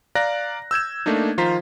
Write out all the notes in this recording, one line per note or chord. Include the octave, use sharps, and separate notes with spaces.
D5 F5 A#5 F#6 A#6
E6 G6 G#6 E7
A3 A#3 D4 D#4
D#3 F3 F4 C5 A#5 B6